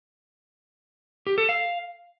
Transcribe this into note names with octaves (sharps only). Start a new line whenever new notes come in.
G4
A4
F5